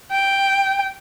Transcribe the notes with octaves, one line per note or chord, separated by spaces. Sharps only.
G5